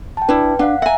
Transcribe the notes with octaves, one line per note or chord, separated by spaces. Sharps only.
G5 A5
D4 E4 B4
D4 F5 F#5
E5 F#5 G#5 A#5